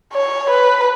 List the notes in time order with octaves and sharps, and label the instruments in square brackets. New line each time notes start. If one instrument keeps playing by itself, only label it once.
[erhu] C#5
B4